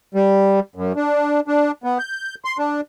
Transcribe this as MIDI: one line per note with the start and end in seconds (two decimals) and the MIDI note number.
0.14 0.59 55
0.76 0.92 42
0.96 1.40 62
1.48 1.71 62
1.84 1.98 59
1.99 2.35 91
2.45 2.57 84
2.59 2.81 62